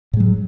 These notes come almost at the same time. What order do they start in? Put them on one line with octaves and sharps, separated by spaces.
A2 G#3 F#3